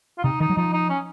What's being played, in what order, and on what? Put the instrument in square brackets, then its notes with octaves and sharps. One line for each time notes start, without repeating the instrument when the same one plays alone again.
[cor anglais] F4
[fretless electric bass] C3 [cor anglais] D#4
[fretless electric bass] D#3 [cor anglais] D#4
[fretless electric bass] F#3
[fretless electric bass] F3 [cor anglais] D#4
[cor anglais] D#4
C#4